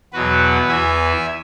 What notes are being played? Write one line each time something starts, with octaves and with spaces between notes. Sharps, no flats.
E2 B2 F#3 F#4 B4
E2 E3 E5 G#5